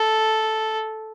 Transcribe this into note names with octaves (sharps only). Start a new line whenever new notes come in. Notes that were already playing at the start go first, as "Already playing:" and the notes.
Already playing: A4